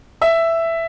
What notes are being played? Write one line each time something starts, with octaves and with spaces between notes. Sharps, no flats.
E5